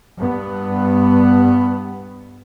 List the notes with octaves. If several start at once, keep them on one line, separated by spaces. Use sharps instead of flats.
G2 B3